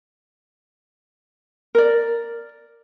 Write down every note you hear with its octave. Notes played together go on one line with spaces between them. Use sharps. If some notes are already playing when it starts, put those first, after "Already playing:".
A#4 D5